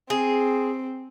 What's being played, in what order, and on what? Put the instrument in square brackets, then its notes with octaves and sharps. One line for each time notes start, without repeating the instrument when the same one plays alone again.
[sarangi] C4 [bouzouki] G#4